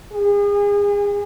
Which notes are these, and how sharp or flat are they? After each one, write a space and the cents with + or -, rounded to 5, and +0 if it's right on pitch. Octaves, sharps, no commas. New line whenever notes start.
G#4 -35